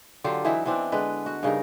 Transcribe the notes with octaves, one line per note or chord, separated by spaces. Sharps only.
D3 F#3 F4 G4
E3 F#3 D#4 E4
E3 B3 C4 D4
D3 G#3 B4
F#4
G2 C#3 D#4 A#4